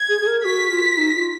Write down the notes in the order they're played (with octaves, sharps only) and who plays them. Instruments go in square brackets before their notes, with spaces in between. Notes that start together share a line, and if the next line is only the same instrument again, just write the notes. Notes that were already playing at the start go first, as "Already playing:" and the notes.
Already playing: [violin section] G#6
[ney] G#4
G#4
A#4
[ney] F#4 [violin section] B6
[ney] F4
D#4
F4